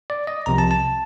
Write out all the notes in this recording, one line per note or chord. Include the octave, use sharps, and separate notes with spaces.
D5
D#5
C2 C3 F3 A#5
A5
A5